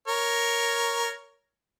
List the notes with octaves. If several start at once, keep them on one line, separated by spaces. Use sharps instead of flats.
A#4 C#5